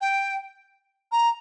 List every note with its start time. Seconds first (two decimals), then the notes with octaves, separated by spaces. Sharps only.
0.01 G5
1.12 A#5